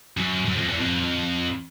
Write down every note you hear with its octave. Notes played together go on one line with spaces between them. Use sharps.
F#2
F#2
F2
E2
F2